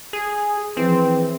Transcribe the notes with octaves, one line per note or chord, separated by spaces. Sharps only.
G#4
E3 F3 C4 G#4